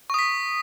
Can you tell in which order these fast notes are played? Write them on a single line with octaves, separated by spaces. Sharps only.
C#6 D#6 B6